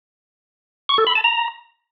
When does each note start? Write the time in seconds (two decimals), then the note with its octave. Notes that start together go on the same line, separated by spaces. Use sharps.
0.89 C#6
0.98 A4
1.07 B5
1.15 A5
1.24 A#5